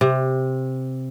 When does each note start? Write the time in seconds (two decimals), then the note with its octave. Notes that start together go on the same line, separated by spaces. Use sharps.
0.01 C3